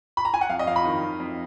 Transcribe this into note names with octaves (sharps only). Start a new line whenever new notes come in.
B5
A#5
G#5
F#5
F2 F5
D#5
F2 F5
B5
D#3
F2
F2